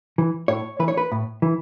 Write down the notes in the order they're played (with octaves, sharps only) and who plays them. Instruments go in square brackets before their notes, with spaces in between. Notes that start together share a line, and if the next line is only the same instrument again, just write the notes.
[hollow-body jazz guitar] E3
A2 C#5
E3 B4
C#5
B4
A2
E3